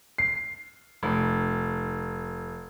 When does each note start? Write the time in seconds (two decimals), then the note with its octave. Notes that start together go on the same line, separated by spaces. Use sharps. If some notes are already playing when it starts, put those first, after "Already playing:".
0.18 C7
1.03 F1